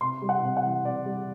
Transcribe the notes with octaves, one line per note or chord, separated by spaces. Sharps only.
C3 C6
G3
F#5
C3
F#5
E3
C3 D5
G3